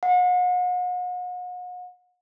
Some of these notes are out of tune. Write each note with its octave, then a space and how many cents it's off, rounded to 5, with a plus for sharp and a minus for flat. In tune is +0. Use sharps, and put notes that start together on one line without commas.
F#5 -40